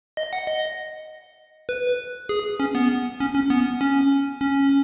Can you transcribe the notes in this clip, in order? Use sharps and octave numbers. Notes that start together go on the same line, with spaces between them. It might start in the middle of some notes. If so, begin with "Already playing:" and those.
D#5
F#5
D#5
B4
G#4
C#4
B3
C#4
C#4
B3
C#4
C#4